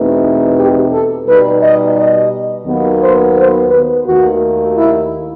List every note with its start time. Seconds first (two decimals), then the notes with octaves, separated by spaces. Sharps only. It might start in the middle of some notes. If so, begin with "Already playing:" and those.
Already playing: E2 B2 A3 C4 D#4
0.57 G4
0.91 A4
1.27 B2 G3 D#4 B4
1.61 D#5
1.96 D#5
2.66 D#2 D#3 F#3 B3
3.02 C5
3.36 C5
3.71 B4
4.05 D#2 D#3 A3 F#4
4.76 E4